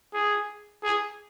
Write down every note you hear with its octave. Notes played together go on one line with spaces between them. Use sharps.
G#4
G#4